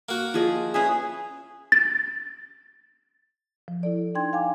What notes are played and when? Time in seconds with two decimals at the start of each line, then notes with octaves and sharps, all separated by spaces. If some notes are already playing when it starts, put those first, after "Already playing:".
0.09 A#3 F#4
0.34 F3 G#4 D#5
0.74 C#4 G#4 B4 E5
1.72 A6
3.68 F3
3.83 E4 A4 D5
4.15 D4 D#4 G5 C6 G#6
4.33 F5 G5 G#5 D6